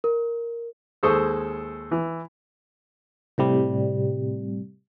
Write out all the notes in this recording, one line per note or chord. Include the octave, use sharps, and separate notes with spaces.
A#4
D#2 G#3 A4 C5 C#6 D#6
E3
A2 C3 G3